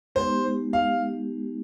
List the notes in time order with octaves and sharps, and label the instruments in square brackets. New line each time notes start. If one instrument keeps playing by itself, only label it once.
[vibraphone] G#3 B3 D#4 G4 [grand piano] C5
[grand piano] F5